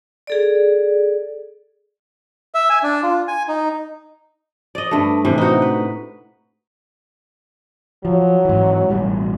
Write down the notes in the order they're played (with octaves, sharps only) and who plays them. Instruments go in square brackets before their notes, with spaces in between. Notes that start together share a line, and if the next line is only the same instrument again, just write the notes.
[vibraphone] G#4 A4 D5
[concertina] E5
G#5
D4
F4
G#5
D#4
[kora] D5 D#5
G2 A3
A2 C3 E3
D#4 F#4
B4
[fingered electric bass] F3 [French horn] F#3
[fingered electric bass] G#2 E3
A1 B2 G3